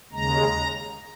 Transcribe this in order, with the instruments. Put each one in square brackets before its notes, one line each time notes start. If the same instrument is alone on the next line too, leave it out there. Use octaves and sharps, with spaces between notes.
[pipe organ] D#2 C#3 G#3 A#5